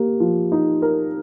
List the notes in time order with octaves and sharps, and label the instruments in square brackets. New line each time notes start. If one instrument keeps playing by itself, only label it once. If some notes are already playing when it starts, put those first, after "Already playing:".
Already playing: [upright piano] A#3 [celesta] G4
[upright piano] F3
D#4
A#4